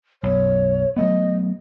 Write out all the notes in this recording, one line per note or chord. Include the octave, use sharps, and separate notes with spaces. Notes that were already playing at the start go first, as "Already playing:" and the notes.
B1 F#2 C#5
F#3 A3 B3 D#5